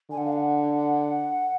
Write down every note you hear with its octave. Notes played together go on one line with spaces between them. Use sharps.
D3 G#5
F#5
F5
F#5